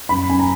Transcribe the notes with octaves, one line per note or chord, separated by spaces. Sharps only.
F#2 B5
F#2 G#5
A#5